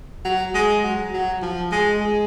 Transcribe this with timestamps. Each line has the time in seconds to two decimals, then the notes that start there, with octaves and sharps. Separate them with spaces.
0.25 F#3
0.55 G#3
0.84 F#3
1.13 F#3
1.42 F3
1.72 G#3
2.01 G#3